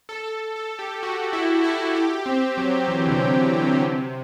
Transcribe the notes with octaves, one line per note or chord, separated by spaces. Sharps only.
A4
A4
A4
G4
F#4
E4
E4
G4
C4
F#3
E3
D3
C3
C3
D3
C3